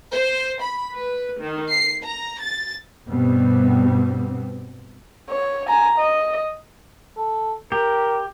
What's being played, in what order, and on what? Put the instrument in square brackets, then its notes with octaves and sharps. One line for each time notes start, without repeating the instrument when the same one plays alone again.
[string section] C5
B5
B4
D#3
C7
A#5
A6
[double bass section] G2 B2 G3 B3 C4
[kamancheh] C#5
G#5 A#5
D#5
[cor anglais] A4
[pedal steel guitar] G4 [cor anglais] A#4